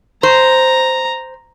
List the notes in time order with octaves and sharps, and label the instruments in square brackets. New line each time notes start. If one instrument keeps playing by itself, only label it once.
[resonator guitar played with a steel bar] C5 [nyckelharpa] A#5